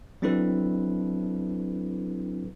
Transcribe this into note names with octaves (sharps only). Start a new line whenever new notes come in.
F#3 C4 D4 E4 A4 B4